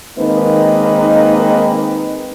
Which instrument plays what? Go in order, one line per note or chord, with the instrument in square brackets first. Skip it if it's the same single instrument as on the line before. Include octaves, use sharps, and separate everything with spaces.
[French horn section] D#3 G#3 A#3 C4 D#4 B4